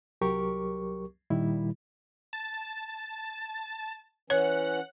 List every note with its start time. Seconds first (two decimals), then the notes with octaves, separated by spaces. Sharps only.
0.21 C2 F#3 G4 A#4 C#6
1.30 A#2 D#3 G3 E4
2.33 A5
4.30 E3 C#4 C#5 F#5